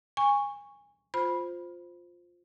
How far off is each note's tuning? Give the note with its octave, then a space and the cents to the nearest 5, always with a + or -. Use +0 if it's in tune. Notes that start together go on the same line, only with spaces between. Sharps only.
G#5 -20 C#6 +0
F4 +10 C5 -5 B5 -10